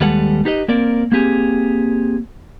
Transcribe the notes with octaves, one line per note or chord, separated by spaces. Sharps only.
D#2 G3 G#3 A4 B4 F#5
D#4 G4 B4 D#5
A#3 C4 A#4 D5
A#3 C4 G4 G#4